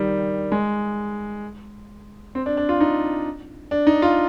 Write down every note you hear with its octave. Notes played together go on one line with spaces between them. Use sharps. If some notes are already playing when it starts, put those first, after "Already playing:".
Already playing: D#3 G3
G#3
C4
D4
D4
F4
D#4
D4
D#4
F4